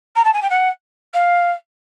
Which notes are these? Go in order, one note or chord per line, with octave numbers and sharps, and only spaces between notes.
A#5
A5
G#5
G5
F#5
F5